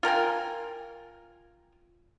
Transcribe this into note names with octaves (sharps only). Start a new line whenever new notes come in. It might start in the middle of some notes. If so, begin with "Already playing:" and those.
F4 A#4 G5 G#5